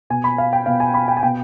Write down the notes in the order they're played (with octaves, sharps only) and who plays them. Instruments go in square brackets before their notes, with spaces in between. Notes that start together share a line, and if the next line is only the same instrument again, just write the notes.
[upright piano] B2 G#5
B5
F5
G5
B2 F5
G#5
B5
G5
G#5
B2 G5